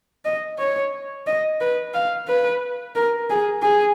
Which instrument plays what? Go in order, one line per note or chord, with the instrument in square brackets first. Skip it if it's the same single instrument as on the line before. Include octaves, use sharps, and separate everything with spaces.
[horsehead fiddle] D#5
C#5
D#5
B4
F5
B4
A#4
G#4
G#4